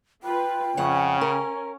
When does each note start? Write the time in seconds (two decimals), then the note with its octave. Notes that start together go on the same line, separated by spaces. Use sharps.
0.23 F4 B4 G5
0.77 F2 C#3 C#4 F#5
1.21 A#4